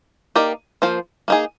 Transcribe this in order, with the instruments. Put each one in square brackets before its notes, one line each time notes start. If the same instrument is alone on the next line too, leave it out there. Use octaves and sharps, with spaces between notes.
[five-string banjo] A#3 D#4 G4 A#4 D5
F3 A#3 F4 C5
A#3 D#4 G#4